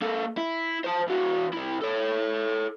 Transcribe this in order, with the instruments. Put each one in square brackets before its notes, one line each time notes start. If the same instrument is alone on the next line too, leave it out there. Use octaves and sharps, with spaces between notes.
[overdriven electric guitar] A#3 A4
E4
C5 A5
E3 F#4
C2 E4
A4 C#5